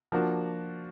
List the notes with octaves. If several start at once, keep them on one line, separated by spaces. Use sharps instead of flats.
F3 A#3 D4 F#4